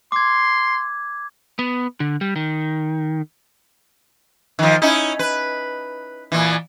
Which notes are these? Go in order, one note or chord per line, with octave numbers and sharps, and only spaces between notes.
C6 D6 G#6
B3
D3
G3
D#3
D#3 F3
C#4 D#4 E4
B4
A#2 E3